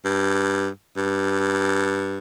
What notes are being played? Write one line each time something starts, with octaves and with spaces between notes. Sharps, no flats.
G2
G2